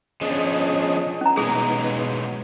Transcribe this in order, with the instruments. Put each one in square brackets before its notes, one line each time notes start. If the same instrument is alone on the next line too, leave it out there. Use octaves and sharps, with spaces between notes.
[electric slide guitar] F3 B3 D4 [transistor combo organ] C#4 G#4 D#5
[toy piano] C#4 A#5
[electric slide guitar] B2 F#3 G#3 [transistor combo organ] B3 D#4 [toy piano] G#4 D#6